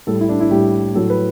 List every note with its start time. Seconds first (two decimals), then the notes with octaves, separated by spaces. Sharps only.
0.07 A2 G3 A4
0.21 E4
0.29 D4
0.40 E4
0.51 A2 G3 G4
0.95 A2 F#3 A4
1.10 B4